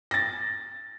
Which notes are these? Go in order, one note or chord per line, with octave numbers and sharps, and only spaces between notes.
A6 A#6